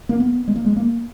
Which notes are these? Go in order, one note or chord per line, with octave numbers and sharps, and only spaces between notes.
A#3
B3
G#3
A#3
G#3
A#3